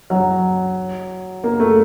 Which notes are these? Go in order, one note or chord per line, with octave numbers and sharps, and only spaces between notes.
F#3
A#3
A3